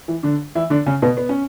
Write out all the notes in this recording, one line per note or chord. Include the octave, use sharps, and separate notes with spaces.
E3
D3 D4
E3 E4
D3 D4
C#3 C#4
B2 B3
B3
C#4